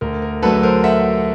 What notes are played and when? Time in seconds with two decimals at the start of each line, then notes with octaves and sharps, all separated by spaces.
0.01 D2 A#4
0.22 A#4
0.42 D3 F#3 A3 A4 B4
0.63 A#4 C5
0.84 E5 F#5